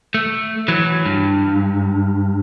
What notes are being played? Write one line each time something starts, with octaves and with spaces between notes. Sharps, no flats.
A3
E3 F#3
G2